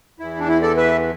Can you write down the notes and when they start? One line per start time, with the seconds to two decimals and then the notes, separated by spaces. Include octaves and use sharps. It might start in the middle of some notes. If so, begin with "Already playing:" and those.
0.20 E2 E3 E4
0.39 D4
0.48 E4
0.62 A4 D5
0.77 B4 E5